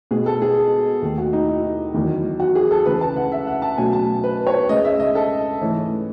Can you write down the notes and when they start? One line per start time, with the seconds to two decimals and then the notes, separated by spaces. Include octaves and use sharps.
0.11 B2 G#3 B3 G#4
0.26 A4
0.42 G#4
1.02 D#2 D#3 A3
1.18 F#4
1.33 D#4
1.48 E4
1.94 E2 D#3 F#3
2.40 F#4
2.55 G#4
2.71 A4
2.86 C#2 C#3 E3 B4
3.01 A5
3.16 F#5
3.32 E5
3.47 F#5
3.62 A5
3.78 B2 F#3 A3 C#4 G#5
3.93 A5
4.24 B4
4.47 C#5
4.69 C#2 C#3 G#3 D#5
4.85 E5
5.00 D#5
5.15 A4
5.61 G#2 E3 A3 C#4